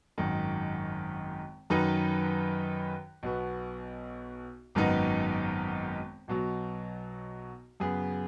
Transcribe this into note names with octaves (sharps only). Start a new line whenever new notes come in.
G#1 F#2 D#3
F#2 D#3 F#3 D#4 B4
B1 B2 B3
G#1 F#2 D#3 B3 D#4
B1 B2 F#3
F#2 C#3 B3 G#4